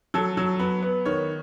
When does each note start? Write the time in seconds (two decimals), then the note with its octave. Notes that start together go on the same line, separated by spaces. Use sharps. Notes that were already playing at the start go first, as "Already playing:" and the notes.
0.14 F#3 A4
0.37 F#3
0.59 B3 B4
0.83 B3
1.05 D#3 C#5